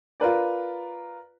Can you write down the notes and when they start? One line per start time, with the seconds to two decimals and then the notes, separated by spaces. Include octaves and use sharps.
0.20 F4 A#4 B4 D5